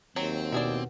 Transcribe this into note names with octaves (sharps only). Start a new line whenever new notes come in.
D#2 F#3 C4
B2 E4 G#4 D5